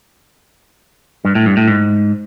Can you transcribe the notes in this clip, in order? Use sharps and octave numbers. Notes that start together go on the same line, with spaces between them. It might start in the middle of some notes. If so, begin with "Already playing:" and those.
G2
A2
G2
A2
G#2